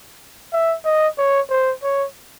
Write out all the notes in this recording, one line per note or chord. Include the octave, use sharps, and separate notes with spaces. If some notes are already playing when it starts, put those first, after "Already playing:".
E5
D#5
C#5
C5
C#5